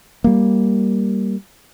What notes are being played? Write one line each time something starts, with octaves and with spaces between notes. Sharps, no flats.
G3 A#3